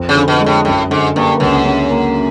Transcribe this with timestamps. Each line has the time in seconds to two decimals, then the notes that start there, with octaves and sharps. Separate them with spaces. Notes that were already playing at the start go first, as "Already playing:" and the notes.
Already playing: F2
0.09 C#3
0.15 D3
0.28 B2
0.40 G#3
0.46 A2
0.65 F#2 A2
0.90 G#2 D3
1.16 G2 A#3
1.40 C#2 F#2
1.66 C#3
1.90 A#3